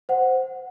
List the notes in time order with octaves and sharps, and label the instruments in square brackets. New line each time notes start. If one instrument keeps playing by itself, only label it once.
[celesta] C5 F#5